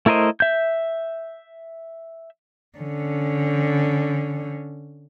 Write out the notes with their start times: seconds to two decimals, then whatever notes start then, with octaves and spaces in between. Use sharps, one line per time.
0.06 A3 E4 A#4 C5 D#5
0.40 E5 G6
2.78 D3 C#4